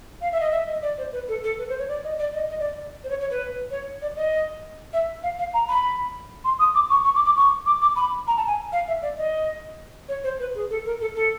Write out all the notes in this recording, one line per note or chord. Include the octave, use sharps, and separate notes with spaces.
F5
E5
D#5
E5
D#5
D5
C5
B4
A4
A4
B4
C5
C#5
D5
D#5
D5
D#5
D#5
D5
C5
C#5
C#5
B4
C#5
D5
D#5
E5
F5
F5
A#5
B5
C6
D#6
D6
C#6
C#6
D6
D6
C#6
D6
D6
B5
A#5
A5
G#5
F5
E5
D5
D#5
C#5
C5
B4
G#4
A4
A#4
A4
A4